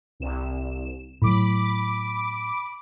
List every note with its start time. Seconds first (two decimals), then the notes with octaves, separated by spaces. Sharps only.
0.20 C2 E7
1.22 A2 F#3 B5 D6